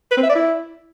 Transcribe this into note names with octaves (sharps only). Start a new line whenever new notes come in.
B4
C4
E5
D5
E4